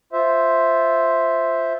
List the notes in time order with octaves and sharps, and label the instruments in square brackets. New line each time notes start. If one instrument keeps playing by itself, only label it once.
[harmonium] F4 C5 E5